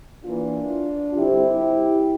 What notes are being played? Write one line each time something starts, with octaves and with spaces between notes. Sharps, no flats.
E3 A#3 D4 F4
D3 G3 C4 E4 G4